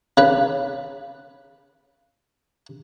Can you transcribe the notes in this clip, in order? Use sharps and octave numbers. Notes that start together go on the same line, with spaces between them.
C#3 B4